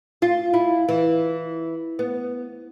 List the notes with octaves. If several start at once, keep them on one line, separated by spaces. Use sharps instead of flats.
F4
E4
E3
B3